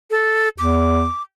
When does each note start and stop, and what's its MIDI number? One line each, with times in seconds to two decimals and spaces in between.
0.11 0.49 69
0.59 1.06 40
0.59 1.22 86